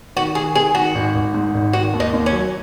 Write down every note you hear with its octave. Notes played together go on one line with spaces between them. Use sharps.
D#3 F#4
D#3 G#4
D#3 G#4
D#3 F#4
G#1
G#1
G#2
G#1
D#3 F#4
D#2
D#4
D#2
C#4
F#3